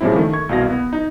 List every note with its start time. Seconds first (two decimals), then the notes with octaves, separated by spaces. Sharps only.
0.01 A#2 C#3 F3 G3 C4 E4
0.16 D#3 A3
0.33 C#6 G#6
0.49 C2 B2 F5 A#6
0.70 B3
0.93 D#4